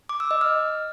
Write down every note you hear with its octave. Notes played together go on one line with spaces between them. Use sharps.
D6
E6
D#5
F6